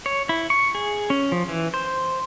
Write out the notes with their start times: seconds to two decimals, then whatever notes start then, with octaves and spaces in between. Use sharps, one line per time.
0.06 C#5
0.29 E4
0.50 C#6
0.75 G#4
1.10 C#4
1.32 F3
1.48 E3
1.74 C5